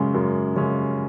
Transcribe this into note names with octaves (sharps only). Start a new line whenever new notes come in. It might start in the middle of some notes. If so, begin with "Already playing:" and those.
Already playing: F#2 C#3 G#3 C#4
F#2
C#3 G#3 C#4